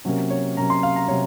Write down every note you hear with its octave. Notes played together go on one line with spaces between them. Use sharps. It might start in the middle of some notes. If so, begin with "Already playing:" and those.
C3 F#3 A#3 C#4
C#5
C3 F#3 A#3 C#4 A#5
C6
F5
A#5
C3 F#3 C#5